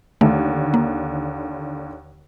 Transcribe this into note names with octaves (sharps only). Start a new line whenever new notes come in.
D#2 D3 A3
A#3